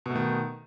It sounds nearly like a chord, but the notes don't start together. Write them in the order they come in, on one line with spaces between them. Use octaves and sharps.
B2 A3 D#3